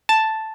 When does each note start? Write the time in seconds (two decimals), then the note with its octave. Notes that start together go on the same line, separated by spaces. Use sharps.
0.09 A5